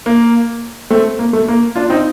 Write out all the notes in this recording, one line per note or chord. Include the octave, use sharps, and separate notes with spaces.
A#3
A3 C4
A#3
A3
A#3
D4 F4
C4 D#4